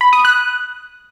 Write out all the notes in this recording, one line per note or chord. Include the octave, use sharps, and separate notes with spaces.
B5
D#6
F#6